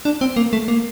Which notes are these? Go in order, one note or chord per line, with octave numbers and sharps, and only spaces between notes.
D4
C4
A#3
A3
A#3